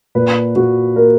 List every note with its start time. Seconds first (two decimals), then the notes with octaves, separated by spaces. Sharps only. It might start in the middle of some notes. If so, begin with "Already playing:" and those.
0.15 A#2 B4
0.56 A#2 F#4
0.96 A#3 A#4